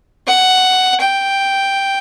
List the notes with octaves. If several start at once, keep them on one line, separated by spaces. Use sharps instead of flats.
F#5
G5